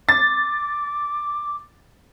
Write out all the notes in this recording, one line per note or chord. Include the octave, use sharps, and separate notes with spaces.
D6 A6